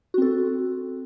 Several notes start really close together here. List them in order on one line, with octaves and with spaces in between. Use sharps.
F#4 C4 A4